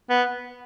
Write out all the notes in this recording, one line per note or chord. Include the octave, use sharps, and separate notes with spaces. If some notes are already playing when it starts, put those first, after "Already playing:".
B3